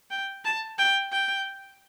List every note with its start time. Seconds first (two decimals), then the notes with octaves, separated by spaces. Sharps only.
0.11 G5
0.45 A5
0.79 G5
1.12 G5